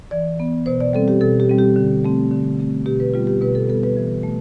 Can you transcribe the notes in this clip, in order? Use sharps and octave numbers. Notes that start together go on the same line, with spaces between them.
E3 D5
B3
B2 C5
D5
G3 C4 A4
G4
B2 A4
G4
G3 C4
G4
D3
A3 C4
D3
A3 C4
B2 G4
B4
G3 B3 F4
G4
B2 B4
A4
G3 B3 A4
B4
E3
A3